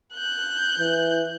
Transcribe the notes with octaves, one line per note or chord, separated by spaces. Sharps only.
F#6 G6
E3